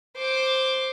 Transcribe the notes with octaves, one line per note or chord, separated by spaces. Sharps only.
C5 D6